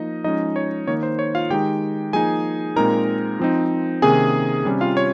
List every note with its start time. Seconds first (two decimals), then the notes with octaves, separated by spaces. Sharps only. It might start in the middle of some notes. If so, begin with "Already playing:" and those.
Already playing: F3 A#3 D#4 D#5
0.24 F3 G#3 C#4 D#4 D#5
0.56 C#5
0.87 D#3 A#3 D#4 C#5
1.03 C5
1.19 C#5
1.35 F4 F5
1.50 D#3 G#3 D#4 G4 G5
2.13 F3 A#3 D#4 G#4 G#5
2.76 A#2 G#3 C4 D#4 A#4 A#5
3.39 F3 C4 D#4
4.02 C3 D#3 A#3 C#4 G#4 G#5
4.65 C3 G3 C#4
4.81 F4 F5
4.97 C#5